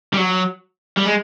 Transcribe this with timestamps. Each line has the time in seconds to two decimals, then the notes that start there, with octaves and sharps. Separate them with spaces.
0.14 G3
0.17 F#3
0.98 G3
1.06 G#3